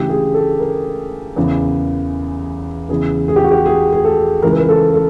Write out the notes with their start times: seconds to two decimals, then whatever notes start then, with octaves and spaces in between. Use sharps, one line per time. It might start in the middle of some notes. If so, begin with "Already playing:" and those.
Already playing: D2 C#3 E3 G4
0.09 G#4
0.34 A4
0.60 A#4
1.36 E2 C#3 E3
2.89 E2 C#3 E3 G#4
3.28 G#4
3.36 G4
3.44 F#4
3.52 G4
3.66 G#4
3.93 G#4
4.04 A4
4.42 C#2 C#3 E3 A#4
4.51 B4
4.58 A#4
4.69 A4
4.94 A4